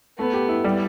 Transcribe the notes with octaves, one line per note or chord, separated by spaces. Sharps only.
A3 B3
G4
E4
G3